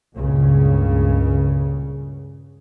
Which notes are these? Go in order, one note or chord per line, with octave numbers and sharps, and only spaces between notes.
C#2 G2 A#2 C#3